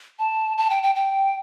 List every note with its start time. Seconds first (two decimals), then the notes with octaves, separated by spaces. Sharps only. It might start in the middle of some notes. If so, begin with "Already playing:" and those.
0.19 A5
0.58 A5
0.70 G5
0.83 G5
0.95 G5